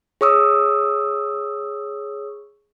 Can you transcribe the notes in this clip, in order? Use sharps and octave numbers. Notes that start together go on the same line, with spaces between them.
G#4 C#5 C#6 D#6 E6